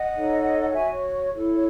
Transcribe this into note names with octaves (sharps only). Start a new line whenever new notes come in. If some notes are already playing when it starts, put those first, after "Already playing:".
Already playing: D#5 F#5
D#4 A4 C#5
F#5
F#4 C#5 E5 G#5
C#5
E4 A4 C#5
C#5